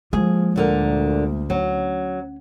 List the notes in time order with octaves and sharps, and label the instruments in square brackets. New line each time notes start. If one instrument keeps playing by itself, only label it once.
[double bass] F3 [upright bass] G#3 A#3 [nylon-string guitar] G#4
[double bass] D2 [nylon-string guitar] A#2 D3 A#4
[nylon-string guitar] F#3 [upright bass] C#4